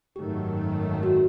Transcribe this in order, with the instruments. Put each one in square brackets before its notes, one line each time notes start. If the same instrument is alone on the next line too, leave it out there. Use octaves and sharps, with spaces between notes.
[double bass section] G#1 F#2 D#3 F#3 A3 [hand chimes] G4
[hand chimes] F#4